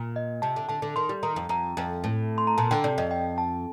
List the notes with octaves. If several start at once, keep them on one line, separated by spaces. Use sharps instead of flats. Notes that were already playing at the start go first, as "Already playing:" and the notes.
Already playing: A#2
D#5
C3 A5
D3
D3 A5
D3
D#3 C6
G3
D#3 A#5
F2
F2 A#5
F2
A2
C6
A#5
A#2 A5
D3 G5
C3 D5
F2 D#5
G5
A5